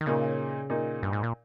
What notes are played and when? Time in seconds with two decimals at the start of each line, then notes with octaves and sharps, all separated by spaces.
0.01 D#3
0.06 A#2 C#3 A#3 D#4
0.70 A#2 A#3 D#4
1.03 G2
1.13 G#2
1.23 A#2